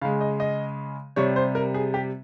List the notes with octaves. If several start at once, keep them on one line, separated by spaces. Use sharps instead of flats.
C#3 G#3 F5
D#5
D#5
C3 G3 C#5
C5
A#4
G#4
G4